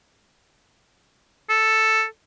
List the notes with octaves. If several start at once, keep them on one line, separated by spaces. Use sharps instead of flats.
A4